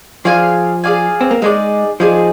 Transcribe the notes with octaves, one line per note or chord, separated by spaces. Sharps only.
F3 G#4 D5 F5 G#5
G#4 D5 F5 G#5
C4
A#3
G#3 D#4 G#4 D5
F3 D#4 G#4 D5